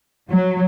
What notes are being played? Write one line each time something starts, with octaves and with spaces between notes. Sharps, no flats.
F#3